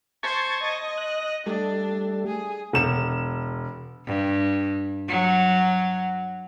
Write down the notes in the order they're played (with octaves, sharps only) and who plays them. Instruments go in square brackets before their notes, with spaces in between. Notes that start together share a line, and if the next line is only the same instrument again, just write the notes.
[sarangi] C5 [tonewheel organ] A5 C#6 G#6
[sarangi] D#5
[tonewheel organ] F#6
[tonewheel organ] G3 A3 [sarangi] D4
[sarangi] G#4
[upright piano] E1 E7
[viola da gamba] G2
F#3